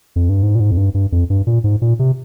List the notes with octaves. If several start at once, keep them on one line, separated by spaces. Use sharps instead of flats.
F2
G2
G#2
A#2
G#2
F2
G2
G2
F2
G2
A#2
G#2
A#2
C3